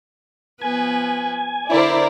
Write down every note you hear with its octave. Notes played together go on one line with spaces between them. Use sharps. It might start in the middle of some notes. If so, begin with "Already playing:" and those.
F3 B3 B4 G#5
D3 E4 A#4 C5 D5